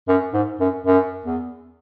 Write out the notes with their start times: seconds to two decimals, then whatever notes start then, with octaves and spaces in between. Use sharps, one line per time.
0.08 F#2
0.33 G#2
0.60 F#2
0.86 F#2
1.26 E2